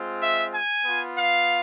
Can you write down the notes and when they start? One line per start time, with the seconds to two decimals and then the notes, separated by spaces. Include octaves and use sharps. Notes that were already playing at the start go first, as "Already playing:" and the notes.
Already playing: G#3 C4 F4
0.20 E5
0.53 G#5
0.86 B3 F4
1.17 F5